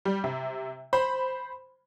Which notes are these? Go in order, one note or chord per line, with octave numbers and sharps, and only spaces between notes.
G3
C3
C5 B5